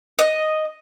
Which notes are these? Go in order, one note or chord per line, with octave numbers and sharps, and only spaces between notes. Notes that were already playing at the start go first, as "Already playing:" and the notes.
D#5